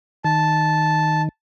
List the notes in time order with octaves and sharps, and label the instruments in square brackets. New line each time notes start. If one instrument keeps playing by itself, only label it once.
[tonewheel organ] D#3 [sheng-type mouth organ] A5